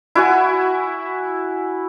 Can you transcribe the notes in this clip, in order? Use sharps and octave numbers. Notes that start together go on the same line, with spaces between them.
E4 F#4 F#5 G#5